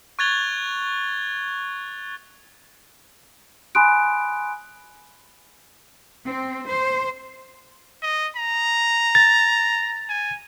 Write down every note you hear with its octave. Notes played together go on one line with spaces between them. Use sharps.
C#6 F#6 G#6 A6 F7 G7
G#5 B5 C6 D#6 F#6 D7
C4
C5
D#5
A#5
A6
G#5